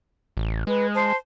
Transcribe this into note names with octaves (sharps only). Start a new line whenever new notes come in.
A1
G#3 B4
C5 A5